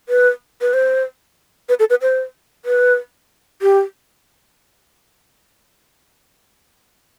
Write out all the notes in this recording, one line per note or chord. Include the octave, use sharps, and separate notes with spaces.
B4
B4
C5
B4
A4
B4
C5
B4
G4